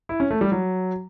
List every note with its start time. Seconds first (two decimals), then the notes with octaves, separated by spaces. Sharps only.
0.09 E4
0.20 C#4
0.30 A3
0.41 G3
0.52 F#3